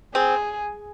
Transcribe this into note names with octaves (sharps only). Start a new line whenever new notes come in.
C4 G#4